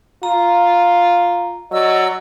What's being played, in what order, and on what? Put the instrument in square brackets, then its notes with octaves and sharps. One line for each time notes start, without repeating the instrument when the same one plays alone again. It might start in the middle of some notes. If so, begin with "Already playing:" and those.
[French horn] F4 [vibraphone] A#5
[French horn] F#3 [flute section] D5 D#5 E6